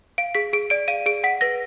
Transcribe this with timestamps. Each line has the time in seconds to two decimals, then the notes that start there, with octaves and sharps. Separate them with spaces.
0.18 F5 D7
0.35 G#4 B6
0.53 G#4 D7
0.70 D5 D7
0.88 F5 D#7
1.06 G#4 D7
1.24 F#5 B6
1.41 B4 A#6